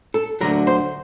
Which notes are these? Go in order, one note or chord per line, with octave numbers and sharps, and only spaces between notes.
A4
D2 D3 F#3 A#4
C5